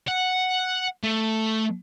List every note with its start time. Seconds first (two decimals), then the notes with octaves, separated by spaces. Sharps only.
0.08 F#5
1.03 A3